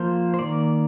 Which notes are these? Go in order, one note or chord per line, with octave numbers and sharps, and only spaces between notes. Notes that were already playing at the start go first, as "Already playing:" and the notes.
Already playing: F3 A#3 C5
C5
D#3 A#3 D5